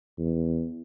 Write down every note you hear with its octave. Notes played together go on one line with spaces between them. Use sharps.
E2